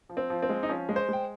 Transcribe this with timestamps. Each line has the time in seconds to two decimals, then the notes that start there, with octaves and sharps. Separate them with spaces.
0.09 F3
0.17 C4
0.30 F3
0.42 C4
0.49 G#3
0.63 D#4
0.69 F3 C#4
0.89 G#3
0.96 C5
1.09 G#3 G5